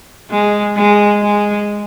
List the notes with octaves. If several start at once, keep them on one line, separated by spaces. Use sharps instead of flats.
G#3
G#3
G#3